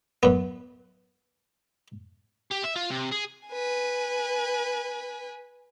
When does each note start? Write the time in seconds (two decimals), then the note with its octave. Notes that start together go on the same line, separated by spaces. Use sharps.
0.23 F#2 B3
2.52 G4
2.64 E5
2.76 F4
2.91 C3
3.12 G#4
3.48 B4 G#5